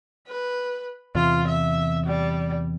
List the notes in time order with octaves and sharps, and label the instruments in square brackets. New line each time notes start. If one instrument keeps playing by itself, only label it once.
[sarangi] B4
[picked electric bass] E2 C3 [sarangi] F4
[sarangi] E5
G3